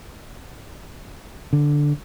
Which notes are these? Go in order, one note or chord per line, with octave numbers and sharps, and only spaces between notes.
D3